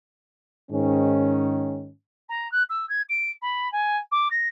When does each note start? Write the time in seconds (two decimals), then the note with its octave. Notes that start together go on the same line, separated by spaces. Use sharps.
0.71 G#2 D#3 C#4
2.29 A#5
2.51 F#6
2.69 E6
2.89 G#6
3.09 D7
3.41 B5
3.72 G#5
4.11 D6
4.31 A#6